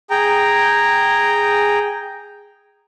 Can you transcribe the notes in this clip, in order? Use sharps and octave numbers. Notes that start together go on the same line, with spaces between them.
G#4 G5 A#5